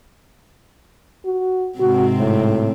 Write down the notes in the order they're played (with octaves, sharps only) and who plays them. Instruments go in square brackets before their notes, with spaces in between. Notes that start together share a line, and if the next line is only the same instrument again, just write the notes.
[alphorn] F#4
[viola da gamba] G#2 C3 C4 [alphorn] F#4
[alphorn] A2